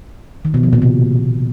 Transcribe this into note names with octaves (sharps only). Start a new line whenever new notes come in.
D#3
B2
F3
A#2
C3